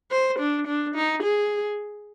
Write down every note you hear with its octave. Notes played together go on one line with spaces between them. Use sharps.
C5
D4
D4
D#4
G#4